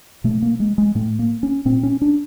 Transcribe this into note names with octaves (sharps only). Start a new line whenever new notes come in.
B2 A3
A#3
G#3
G#3
A2 A3
A#3
C#4
A#2 C4
C#4
D4